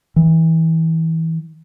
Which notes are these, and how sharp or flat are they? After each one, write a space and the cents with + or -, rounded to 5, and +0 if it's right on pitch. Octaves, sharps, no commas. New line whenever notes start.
E3 -25